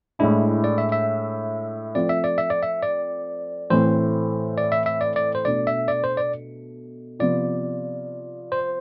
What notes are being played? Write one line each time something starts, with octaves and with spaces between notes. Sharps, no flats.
A2 G#3 D4 E4
D5
E5
E5
F3 A3 C4 D5
E5
D5
E5
D5
E5
D5
A2 E3 A3 C4 C5
D5
E5
E5
D5
D5
C5
B2 A3 D4 D5
E5
D5
C5
D5
C3 F3 B3 F4 D5
C5